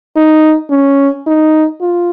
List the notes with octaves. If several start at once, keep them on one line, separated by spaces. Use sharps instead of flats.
D#4
C#4
D#4
F4